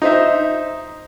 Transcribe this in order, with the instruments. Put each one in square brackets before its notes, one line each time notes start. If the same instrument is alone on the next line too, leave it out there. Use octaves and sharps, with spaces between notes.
[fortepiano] D#4 C5 E5